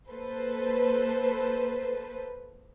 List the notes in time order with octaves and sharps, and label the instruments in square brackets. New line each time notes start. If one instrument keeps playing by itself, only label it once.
[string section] A#3 A4 B4 C5